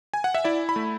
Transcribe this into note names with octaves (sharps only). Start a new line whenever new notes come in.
G#5
F#5
E5
E4 D5
B5
A3